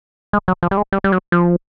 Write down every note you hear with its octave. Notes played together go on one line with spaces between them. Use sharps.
G#3
F#3
F3
G3
G#3
G3
G3
F#3
F3